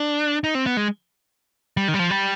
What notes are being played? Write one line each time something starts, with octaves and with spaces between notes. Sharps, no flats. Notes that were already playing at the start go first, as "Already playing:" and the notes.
Already playing: D4
D#4
C4
B3
G#3
G3
D#3
G3
F3
G3